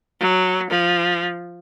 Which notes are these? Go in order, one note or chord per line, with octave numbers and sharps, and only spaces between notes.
F#3
F3